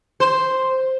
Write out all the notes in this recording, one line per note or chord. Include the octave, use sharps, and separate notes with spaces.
C5